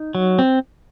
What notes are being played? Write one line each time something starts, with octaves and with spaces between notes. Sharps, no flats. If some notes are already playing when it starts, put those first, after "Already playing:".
Already playing: D#4
F#3
C4